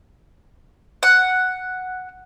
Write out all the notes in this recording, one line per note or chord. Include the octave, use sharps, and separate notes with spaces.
F#5